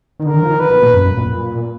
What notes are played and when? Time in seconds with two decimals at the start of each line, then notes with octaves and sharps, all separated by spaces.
0.20 D#3
0.25 D3 A#4
0.34 D#3
0.42 F3
0.51 D#3
0.59 D3 B4
0.71 B2
0.82 A#2
0.94 F#2
1.04 F#2
1.17 A#2
1.28 A#2